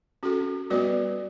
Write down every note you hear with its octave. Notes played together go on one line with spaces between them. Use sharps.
C#4 F#4 A4
G3 B3 F#4 B4 D5